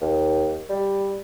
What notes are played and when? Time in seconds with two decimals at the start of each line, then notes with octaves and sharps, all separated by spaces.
0.01 D#2
0.69 G3